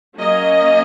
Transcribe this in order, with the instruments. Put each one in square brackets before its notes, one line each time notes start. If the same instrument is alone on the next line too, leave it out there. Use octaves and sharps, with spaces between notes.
[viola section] F#3 A#3 C#4 D#5